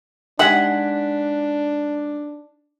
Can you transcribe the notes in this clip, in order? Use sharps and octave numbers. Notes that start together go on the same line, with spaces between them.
G#3 D4 D#4 G4 E5 F#5 F#6 B6